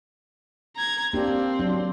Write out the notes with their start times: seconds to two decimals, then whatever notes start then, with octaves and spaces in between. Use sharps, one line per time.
0.76 A#5 G#6
1.13 A#3 C4 D4 G4
1.59 F#3 D4